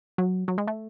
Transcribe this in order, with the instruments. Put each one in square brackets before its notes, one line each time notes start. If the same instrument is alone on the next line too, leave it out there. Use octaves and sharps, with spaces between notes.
[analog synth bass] F#3
F#3
G#3
A3